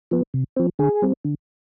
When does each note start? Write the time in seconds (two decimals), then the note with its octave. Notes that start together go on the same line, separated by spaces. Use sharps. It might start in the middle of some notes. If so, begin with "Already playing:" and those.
0.11 F3 B3
0.34 C3
0.56 F3 C4
0.79 D3 G#4
1.02 G3 C4
1.25 D3